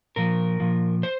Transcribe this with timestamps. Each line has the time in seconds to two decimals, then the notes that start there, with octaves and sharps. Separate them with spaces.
0.16 A#2 F3 A#4
0.60 A#2 F3
1.03 C5